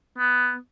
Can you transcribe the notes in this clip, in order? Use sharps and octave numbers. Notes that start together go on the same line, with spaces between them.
B3